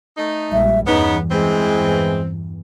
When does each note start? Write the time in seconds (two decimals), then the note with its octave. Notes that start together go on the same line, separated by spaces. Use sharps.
0.18 A3 D#4
0.52 A#1 G3 G#3 E5
0.87 E2 G2 C#3 E3 B3 D#4
1.31 E3 G#3 C4